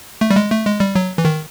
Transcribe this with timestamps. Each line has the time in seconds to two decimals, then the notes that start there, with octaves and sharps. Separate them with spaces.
0.21 A3
0.31 G3
0.36 G#3
0.51 A3
0.66 G#3
0.80 G3
0.95 F#3
1.18 E3
1.25 D#3